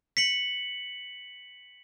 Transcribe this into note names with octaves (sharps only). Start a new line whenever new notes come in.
B6 C#7 F#7